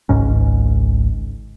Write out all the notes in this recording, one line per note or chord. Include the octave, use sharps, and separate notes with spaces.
G#1 C#2 G#2 C#4